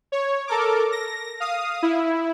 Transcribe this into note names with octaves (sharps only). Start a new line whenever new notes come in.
C#5
A4 A#4 D6
A#6
F5 D#6
E4